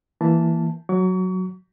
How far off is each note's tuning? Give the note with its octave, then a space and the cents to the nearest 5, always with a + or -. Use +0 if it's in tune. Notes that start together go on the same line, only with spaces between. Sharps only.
E3 +10 A#3 +0 A5 +0
F#3 +0 C#6 +35